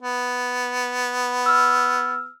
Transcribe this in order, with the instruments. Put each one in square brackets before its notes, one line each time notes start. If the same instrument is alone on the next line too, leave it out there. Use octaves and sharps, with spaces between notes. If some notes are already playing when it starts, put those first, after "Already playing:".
[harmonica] B3
[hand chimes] E6 F6